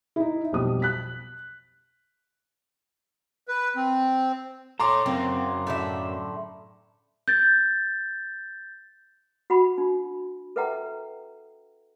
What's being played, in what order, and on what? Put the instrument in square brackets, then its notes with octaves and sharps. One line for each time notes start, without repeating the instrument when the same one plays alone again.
[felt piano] D#4 E4
B1 F2 G3 D#6
F#6 B6
[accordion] B4
C4
[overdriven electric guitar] A4 C#5 [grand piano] A#5 C6 D6
[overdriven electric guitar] F#2 A#3 [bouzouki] C4
[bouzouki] A2 D3 E5
[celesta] G6 A6
[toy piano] F#4 F#5 B5
D4
A4 B4 E5 F#5 G5 A#5